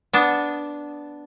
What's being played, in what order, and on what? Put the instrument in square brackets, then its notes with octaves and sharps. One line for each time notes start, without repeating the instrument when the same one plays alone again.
[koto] B3 D4